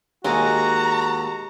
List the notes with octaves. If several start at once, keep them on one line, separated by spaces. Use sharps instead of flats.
D#2 G#3 F#4 G#5 A#5 D6